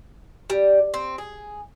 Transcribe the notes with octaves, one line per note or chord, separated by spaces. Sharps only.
G3
C4
G#4